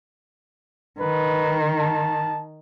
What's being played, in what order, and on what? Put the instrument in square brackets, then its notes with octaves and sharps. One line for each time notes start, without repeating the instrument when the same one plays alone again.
[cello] D#3 [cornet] B4
[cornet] A5